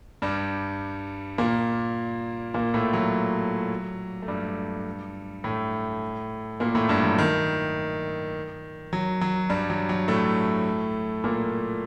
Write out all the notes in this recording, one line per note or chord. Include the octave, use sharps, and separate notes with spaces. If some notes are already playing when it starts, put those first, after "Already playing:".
G2 G3
A#2 A#3
A#2 A#3
A2 A3
F#3
A3
G2 G3
A2 A3
A#2 A#3
A2 A3
G2 G3
F#3
D#3
F#3
F#3
G2 G3
F#3
F#3
A2 A3
A#2 A#3